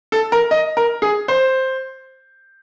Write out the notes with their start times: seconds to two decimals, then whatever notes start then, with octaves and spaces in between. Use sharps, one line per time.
0.12 A4
0.32 A#4
0.51 D#5
0.77 A#4
1.02 G#4
1.28 C5